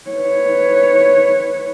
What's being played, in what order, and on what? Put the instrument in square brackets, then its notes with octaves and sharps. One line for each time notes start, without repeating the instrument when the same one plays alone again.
[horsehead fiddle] B4 C#5